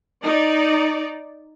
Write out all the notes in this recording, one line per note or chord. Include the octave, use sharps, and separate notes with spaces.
D#4 D5